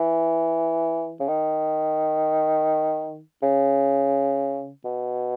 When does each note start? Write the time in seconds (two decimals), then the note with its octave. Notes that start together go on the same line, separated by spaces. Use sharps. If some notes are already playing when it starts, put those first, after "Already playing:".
Already playing: E3
1.20 C#3
1.28 D#3
3.42 C#3
4.85 B2